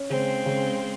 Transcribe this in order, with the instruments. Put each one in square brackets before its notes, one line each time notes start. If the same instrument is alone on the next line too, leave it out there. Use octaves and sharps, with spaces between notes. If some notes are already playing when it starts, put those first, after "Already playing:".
Already playing: [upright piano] C#4
[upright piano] C#3 [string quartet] G#3 C4
[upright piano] C#3